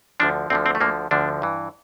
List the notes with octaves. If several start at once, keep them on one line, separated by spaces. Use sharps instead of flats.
D2 D3 F3 D4
D2 D3 F3 C4
C4
A3
D2 D3 F3 A#3
D2 D3 F3 D4
G2 E3